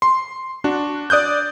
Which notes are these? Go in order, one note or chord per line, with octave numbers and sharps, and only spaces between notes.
C6
D4 F#4
D5 D#6 F#6 G6